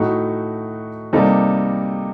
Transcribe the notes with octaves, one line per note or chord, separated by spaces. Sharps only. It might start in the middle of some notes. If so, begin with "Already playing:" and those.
Already playing: A2 A3 D#4 F#4
C3 G3 A#3 D#4 A4